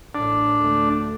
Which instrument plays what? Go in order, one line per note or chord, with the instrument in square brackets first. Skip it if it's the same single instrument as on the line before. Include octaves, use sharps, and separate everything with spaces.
[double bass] A1 A2 [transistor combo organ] D4
[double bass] D2 A3